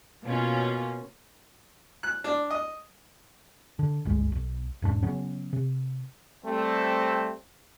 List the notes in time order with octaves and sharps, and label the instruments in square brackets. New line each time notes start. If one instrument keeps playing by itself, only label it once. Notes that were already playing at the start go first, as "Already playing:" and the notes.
[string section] B2 A#3 C#4 F4
[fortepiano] F#6
D4
D#5
[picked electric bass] D3
G1 C#2 G#3
B1
E1 G#2 G3 D4
C#3 F#3 B3 C#4
C3
[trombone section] G3 A3 C4